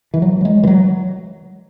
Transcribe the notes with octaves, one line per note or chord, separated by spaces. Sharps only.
E3
F#3
F#3
G#3
E3
F#3